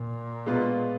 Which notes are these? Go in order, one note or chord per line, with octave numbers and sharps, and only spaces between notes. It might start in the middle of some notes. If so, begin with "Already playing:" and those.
Already playing: A#2
B2 G#3 B3 F4 B4